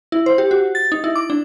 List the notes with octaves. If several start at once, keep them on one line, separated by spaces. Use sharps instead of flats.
E4
C5
G4
F#4
A6
D#4
E4
D6
D4